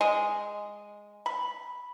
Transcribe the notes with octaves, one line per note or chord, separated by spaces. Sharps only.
G#3
B5